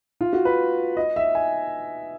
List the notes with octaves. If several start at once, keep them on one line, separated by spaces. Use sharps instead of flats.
F4
F#4
B4
D#5
E5
G#5